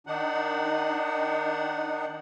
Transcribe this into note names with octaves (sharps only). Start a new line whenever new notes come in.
D#3 D4 D#4 F#5